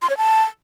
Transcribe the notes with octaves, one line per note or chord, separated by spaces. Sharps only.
C6
C#5
A5